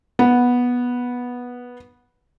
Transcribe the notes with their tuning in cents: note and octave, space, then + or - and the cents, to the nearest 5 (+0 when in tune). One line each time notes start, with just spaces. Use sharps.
B3 -10